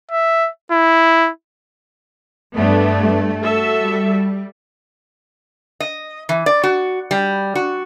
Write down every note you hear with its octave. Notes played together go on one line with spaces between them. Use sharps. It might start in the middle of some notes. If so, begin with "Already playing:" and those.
E5
E4
G2 A3 B3 D4
F#4 A4 E5
G3
D#5
E3
D5
F#4
G3
F#4